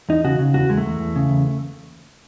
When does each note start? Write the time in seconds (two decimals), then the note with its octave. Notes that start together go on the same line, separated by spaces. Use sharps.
0.09 E2 D#4
0.25 C#3 F#4
0.39 C#3
0.54 E2 F#4
0.69 E2 G#3
0.77 A3
0.85 E2
1.00 E2
1.16 C#3
1.30 E2